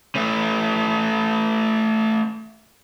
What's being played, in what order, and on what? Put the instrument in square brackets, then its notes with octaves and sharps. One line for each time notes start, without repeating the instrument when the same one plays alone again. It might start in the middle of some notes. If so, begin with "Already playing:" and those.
[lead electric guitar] A3 C#4